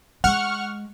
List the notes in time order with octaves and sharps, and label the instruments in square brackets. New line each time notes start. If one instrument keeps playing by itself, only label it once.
[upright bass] G#3 [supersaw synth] F#5 C#6 F6